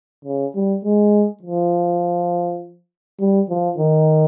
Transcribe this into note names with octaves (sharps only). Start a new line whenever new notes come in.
C#3
G3
G#3
F3
G3
F3
D#3